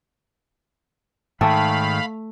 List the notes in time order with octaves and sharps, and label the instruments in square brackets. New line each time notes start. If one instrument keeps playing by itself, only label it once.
[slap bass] G#2 D#3 [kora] A3 [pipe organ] F5 B5 [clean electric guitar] G5 A5